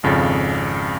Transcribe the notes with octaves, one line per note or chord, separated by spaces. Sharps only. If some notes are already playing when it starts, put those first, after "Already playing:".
G#1 F2 C#3 F5 A6